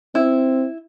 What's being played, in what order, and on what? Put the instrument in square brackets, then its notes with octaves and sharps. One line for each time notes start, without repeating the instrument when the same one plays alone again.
[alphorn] C4 [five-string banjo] E4